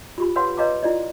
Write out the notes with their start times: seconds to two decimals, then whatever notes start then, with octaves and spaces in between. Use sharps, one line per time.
0.18 F4 G4 B5
0.36 B4 C#5 F5 F#5 B5 C6
0.57 B4 C#5 D#5 F5 A#5 D6
0.83 E4 F4 D5 D#5